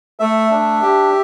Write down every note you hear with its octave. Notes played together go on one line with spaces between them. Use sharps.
A3 E5
D4
G4